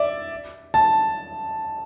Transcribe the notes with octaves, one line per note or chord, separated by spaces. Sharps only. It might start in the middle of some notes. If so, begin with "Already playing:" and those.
Already playing: D5 E5
A5